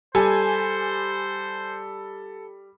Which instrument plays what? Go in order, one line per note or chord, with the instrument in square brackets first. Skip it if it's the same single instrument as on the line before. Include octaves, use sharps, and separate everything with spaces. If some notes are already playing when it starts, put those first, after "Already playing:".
[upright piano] G3 [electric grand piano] A4 [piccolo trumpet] C5 [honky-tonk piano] G#5